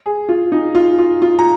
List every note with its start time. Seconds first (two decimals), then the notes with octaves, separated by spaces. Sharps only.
0.06 G#4
0.29 F4
0.52 D#4
0.75 F4
0.98 F4
1.22 F4
1.39 A#5